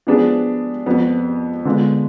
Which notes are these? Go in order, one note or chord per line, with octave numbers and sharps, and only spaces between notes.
F3 B3 D4 G#4
F2 F3 B3
D3 G#3 B3 F4